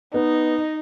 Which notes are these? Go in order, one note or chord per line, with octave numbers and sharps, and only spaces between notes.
B3 D#4